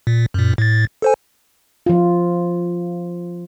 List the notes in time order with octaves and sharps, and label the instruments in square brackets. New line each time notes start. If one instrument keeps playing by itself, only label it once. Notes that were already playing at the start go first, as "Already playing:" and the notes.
[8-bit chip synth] A#2
F#2 A#2
A2 A6
A4 C5 G#5
[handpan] F3 F4